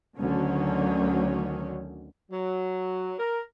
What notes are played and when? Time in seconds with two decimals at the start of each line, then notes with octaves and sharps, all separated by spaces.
0.18 D2 D3 D#3 F#3 C#4
2.31 F#3
3.19 A#4